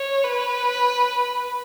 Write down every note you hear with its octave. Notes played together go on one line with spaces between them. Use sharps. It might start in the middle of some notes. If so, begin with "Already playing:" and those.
Already playing: C#5
B4